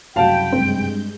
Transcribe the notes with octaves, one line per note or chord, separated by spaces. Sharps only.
F#1 C2 F#2 F#4 F5 G5 A5 B5
G2 G#3 C4 G6